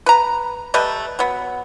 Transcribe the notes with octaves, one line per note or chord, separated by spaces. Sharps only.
B4 A#5
G3 A3 B4 D#5
F#3 B3